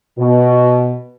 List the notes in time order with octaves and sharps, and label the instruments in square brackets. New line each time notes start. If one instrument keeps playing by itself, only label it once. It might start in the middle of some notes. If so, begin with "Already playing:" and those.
[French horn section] B2